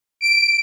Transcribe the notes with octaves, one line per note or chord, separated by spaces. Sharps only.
D7